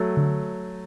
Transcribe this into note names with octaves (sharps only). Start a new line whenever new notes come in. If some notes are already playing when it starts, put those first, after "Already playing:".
Already playing: F#3 A3
D3